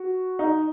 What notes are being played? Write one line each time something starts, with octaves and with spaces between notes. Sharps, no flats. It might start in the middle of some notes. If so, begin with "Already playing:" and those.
Already playing: F#4
D#4